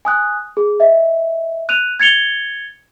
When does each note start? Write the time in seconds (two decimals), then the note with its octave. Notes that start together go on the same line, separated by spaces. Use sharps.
0.05 G#5 D#6 F#6
0.57 G#4
0.80 D#5 E5
1.69 F#6 D#7 F7
2.00 G#6 A6 C#7 F7 G7